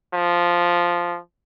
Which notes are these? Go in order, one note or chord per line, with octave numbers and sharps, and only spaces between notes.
F3